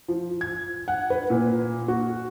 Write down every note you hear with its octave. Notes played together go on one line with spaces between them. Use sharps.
F3
G#6
F#5
B4
A#2
F#4